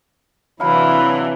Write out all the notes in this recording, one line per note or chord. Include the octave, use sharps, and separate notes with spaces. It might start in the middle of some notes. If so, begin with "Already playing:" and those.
C3 E3 F#3 D4 E4 F5 B5